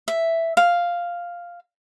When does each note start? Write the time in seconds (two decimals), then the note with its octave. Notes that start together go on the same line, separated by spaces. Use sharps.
0.08 E5
0.57 F5